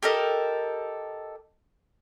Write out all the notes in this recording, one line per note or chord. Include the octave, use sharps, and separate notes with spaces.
G4 A4 A#4 D#5